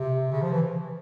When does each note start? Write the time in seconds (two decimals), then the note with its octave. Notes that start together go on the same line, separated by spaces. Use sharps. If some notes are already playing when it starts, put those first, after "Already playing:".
Already playing: C3
0.32 C#3
0.42 F3
0.51 E3